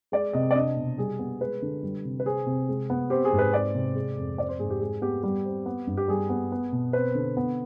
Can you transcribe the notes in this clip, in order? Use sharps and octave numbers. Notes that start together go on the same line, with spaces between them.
G#3 D5
C3 D#5
D5
D4 D#5
B2
G3 G#4
B3
G#3 B4
D3
G3
C3
B4
C4 G#4
C3
G#3
B3
C4 G4
G#4
G#2
B4
C4 D5
C3
G#3
F2
C4 D5
C5
G#2 G#4
G4
G#3 G#4
B3 G4
G3 G4
C4
B3
G2
G4
G3 G#4
B3
B3
B2
C4 B4
D3
B3